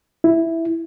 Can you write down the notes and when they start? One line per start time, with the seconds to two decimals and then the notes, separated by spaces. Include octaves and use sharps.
0.24 E4